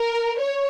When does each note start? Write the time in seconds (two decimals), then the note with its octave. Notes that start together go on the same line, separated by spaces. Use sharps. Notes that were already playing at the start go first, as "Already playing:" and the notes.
Already playing: A#4
0.40 C#5